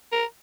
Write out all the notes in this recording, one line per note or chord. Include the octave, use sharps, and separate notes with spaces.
A#4